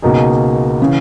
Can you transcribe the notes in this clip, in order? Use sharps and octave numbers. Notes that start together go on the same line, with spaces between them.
C#2 B2 A#3 D#4 G#4
C#3 E3